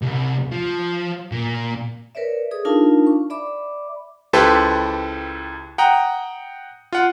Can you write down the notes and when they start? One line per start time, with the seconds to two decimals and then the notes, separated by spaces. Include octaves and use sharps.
0.02 C2
0.51 F3
1.32 A#2
2.15 A#4 B4 C#5 D5 E5
2.51 G#4 A4 D#6
2.65 D4 D#4 F4 A#4 F5 A5
3.07 C#6
3.30 D5 E5 B5 D6
4.33 C#2 E4 G4 A4 B4 C5
5.78 F#5 G5 A#5 D#6
6.93 F4 F#5